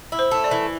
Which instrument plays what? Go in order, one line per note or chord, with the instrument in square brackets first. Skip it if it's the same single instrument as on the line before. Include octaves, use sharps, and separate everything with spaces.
[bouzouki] E4
[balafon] C5
[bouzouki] A3
[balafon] D5
[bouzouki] E3